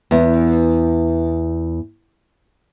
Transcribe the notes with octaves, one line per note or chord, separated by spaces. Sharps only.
E2 B3